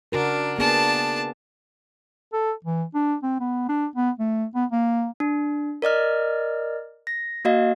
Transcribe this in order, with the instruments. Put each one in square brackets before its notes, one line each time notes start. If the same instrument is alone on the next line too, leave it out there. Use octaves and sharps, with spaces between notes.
[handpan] C#3 F#4 A#4 [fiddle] D4
[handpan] A#3 B3 G#4 [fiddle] D4 A5
[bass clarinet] A4
E3
D4
C4
B3
D4
B3
A3
B3
A#3
[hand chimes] D4
A#4 D5 D#5 F6
A#6
A#3 F#4 D#5 F5